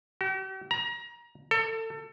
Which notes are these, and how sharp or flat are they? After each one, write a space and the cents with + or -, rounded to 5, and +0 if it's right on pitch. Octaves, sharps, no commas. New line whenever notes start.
G4 -45
A#5 +30
A4 +30